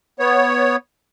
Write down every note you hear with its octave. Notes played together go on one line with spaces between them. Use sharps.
B3 C#5